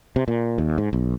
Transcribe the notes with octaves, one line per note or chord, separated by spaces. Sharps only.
C3
A#2
D#2
G#2
B1